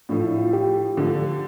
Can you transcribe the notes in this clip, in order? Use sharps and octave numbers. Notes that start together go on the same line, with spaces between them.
A2 F3 A3 D4
E4
F4
G4
D3 F3 A3